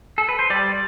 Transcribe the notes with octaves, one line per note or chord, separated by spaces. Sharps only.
A4
B4
C5
G3 D5